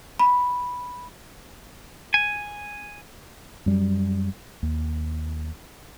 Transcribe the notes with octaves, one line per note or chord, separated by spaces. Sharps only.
B5
G#5
F#2 G3
D#2